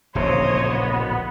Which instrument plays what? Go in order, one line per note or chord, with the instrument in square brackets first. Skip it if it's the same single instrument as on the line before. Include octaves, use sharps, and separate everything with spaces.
[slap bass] D1 A#1 C#3 [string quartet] C5 C#5 D#5
[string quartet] B3